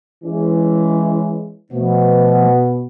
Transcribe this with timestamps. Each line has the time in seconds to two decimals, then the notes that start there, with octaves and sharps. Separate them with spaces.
0.24 E3 G#3 C#4
1.73 B2 F3 A3 B3